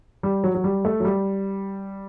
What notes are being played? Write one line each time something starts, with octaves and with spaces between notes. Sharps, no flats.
G3
F#3
F#3
G3
A3
F#3
G3